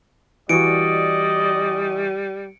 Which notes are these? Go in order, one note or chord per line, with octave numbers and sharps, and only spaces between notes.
E3 G3 F#4 D5 D#5 C#7 D7